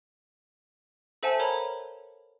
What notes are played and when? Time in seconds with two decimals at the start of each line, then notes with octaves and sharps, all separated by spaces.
1.23 A4 C5 E5 F#5 G#5 A5
1.39 A#4 C#5 A#5 B5